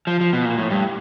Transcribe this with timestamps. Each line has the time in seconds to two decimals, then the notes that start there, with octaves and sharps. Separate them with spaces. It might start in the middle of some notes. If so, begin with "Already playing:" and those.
0.07 F3
0.21 F3
0.33 B2
0.45 A#2
0.58 A2
0.71 G2